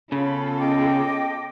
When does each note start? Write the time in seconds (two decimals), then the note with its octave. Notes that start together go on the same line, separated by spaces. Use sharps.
0.12 C#3 B3 C#4 F4 A4 B5
0.59 D#5 G5 D6